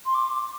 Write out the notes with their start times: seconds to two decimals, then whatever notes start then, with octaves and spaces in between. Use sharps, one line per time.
0.05 C6
0.14 D6